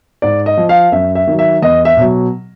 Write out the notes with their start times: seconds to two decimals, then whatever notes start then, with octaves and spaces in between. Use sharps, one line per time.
0.22 G#2 D5
0.46 D#5
0.57 F3
0.69 F5
0.92 F#2 E5
1.15 E5
1.27 D#3 F#3
1.39 E5
1.62 E2 D#5
1.85 E5
1.97 B2 F#3